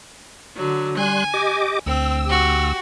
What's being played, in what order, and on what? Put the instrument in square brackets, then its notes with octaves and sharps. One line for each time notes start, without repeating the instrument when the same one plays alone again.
[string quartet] D3 F#3
[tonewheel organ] G3 C6 F#6 [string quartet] G#5
[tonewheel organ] G4 D#5 D6
[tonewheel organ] D2 E6 [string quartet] C4
[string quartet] F#4 G4